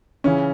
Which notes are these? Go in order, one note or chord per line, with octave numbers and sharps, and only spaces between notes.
C#3 E3 C#4